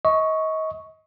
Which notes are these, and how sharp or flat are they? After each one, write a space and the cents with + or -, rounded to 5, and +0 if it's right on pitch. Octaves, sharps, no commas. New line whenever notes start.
D#5 +30 C#6 +0